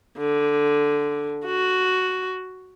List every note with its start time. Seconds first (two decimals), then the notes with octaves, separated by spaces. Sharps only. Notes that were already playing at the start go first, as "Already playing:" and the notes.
0.18 D3
1.46 F#4